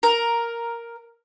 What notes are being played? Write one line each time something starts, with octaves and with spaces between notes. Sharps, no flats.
A#4